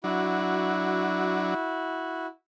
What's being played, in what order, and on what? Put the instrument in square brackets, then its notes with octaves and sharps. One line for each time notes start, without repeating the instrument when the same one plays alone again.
[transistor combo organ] F#3 D4 [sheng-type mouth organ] E4 F#4